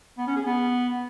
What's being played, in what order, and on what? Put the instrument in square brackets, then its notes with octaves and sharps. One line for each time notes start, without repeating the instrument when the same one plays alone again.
[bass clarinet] B3
C#4
G#4
B3